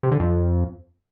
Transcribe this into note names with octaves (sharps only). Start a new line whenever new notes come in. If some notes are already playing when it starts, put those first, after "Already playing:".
C3
D3
F2